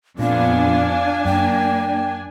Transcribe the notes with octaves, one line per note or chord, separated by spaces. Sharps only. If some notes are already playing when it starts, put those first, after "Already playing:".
F2 A#2 B3 D4 F5 G#5
F#2 A#3 G5